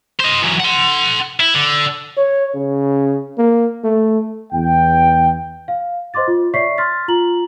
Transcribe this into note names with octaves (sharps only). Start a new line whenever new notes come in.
C5 D#5
E3 F#3
F#5 C6
E4
D3
C#5
C#3
A#3
A3
E2 G5
F5
C5 D#5 C6 D6 A6
F4
C#5 D5 E5 C#6 B6 C7
C6 F6 A6 B6
F4 A#5 F#7